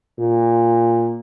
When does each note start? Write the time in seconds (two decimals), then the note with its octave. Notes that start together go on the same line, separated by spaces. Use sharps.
0.19 A#2